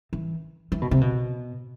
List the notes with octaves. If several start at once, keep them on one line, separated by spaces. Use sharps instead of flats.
E3
E3
B2
C3
B2